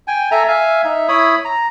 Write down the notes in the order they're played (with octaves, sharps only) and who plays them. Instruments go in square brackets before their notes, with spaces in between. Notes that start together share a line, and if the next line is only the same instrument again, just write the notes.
[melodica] G5 G#5
A4 E5 G#5 A#5
E5 F5 G#5
D#4 E5
E4 C#5 B5 D#6
A#5